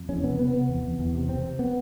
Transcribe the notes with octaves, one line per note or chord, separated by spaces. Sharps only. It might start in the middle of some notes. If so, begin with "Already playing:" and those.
Already playing: F2
E2 C#4
C3 B3
C3 B3
C3 B3
E2
E2
E2
C3
C3 C4
C3
B3